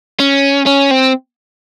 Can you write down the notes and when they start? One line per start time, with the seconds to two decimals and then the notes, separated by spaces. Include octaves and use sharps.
0.20 C#4
0.66 C#4
0.91 C4